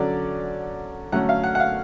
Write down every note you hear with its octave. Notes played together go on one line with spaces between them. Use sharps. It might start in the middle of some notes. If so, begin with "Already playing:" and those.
Already playing: D3 F#3 C#4 D5
D3 F#3 A3 C#4 F#5
F5
F#5
F#5
F5